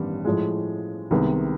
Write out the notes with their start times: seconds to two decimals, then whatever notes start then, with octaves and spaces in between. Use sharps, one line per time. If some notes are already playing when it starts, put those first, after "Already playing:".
Already playing: A1 G2 D#3 G3 B3
0.25 A2 F3 G#3
1.11 C2 C3 D#3 G#3 B3